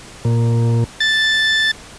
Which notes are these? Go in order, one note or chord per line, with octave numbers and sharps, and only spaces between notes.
A#2
A6